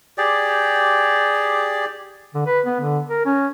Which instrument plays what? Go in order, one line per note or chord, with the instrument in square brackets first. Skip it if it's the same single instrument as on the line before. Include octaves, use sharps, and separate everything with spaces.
[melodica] G4 G#4 D5
[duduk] D3
B4
B3
D3
A#4
C#4